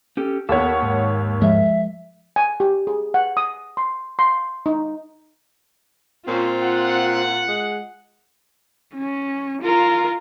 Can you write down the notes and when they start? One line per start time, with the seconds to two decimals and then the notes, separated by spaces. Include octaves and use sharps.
0.17 C#4 G4 A4
0.49 D#2 B3 A4 C#5 F#5
0.82 G#2
1.42 F3 G#3 E5
2.36 G#5
2.60 G4
2.87 G#4
3.14 F#5
3.37 D#6
3.77 C6
4.19 C6
4.66 D#4
6.28 A#2 C4 C#4 F4 C5
6.63 F#5
7.48 G#3
8.95 C#4
9.62 F4 A#4